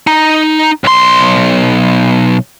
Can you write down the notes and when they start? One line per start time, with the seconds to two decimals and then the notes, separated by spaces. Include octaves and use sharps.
0.07 D#4
0.84 B1 C6